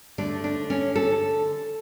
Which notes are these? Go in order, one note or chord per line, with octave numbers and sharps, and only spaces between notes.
D3 A3 D4
D4
C#4
A4